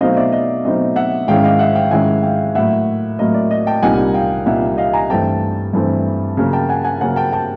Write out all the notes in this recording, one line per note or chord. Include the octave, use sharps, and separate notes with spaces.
B2 F#3 A3 C4 D#4 D#5 F5
D5 E5
D#5
B2 F#3 A3 C4 D#4 D#5
E5 F#5
G#2 D#3 G#3 C#4 E4 F5 G5
D#5 F5
E5 F#5
F5 G5
G#2 D#3 G#3 C#4 E4 F#5 G#5
F5 G5
A2 F#3 A#3 E5 F#5
A2 F#3 A#3 D#5
D5
D#5
G5 A5
C2 A#2 G3 A#3 D#4 F#5 G#5
F5 G5
C2 A#2 G3 A#3 D#4 E5 F#5
D#5 F5
G#5 A#5
G2 E3 A3 C4 G5 A5
G2 E3 A3 C4
C#3 F#3 A#3 C#4
G5 A5
F#5 G#5
F#5 G#5
C#3 F#3 A#3 C#4 F#5 G#5
G5 A5
G5 A5